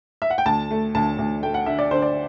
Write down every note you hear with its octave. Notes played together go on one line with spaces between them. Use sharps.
E5
F#5
G5
D2 A5
A3
D2 A5
D2
A3 G5
F#5
D3 E5
D5
D3 C5
D5